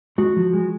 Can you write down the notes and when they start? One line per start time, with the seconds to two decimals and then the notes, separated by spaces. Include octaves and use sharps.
0.18 G#3 F#4
0.37 F3
0.53 G#3